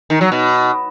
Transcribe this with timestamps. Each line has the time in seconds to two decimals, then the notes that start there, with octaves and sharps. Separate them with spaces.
0.10 D#3
0.21 F#3
0.32 B2